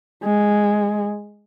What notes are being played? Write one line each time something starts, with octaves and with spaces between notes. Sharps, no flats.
G#3